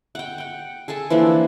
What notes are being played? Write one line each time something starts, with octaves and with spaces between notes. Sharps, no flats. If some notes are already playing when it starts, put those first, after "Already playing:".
F#5 G5
F#5 G5
G#4 A4 G#5 A5
E3 F3 A#3 D4